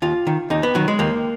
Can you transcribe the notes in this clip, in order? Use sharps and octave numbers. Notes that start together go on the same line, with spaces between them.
D#2 F4
D#3
D#2 D#4
B3
D#3 F#3
G#3
D#2 A#3